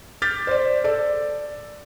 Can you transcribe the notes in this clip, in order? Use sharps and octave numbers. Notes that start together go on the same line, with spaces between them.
D6 F6 G6 A6 B6
C5 D5
A4 D5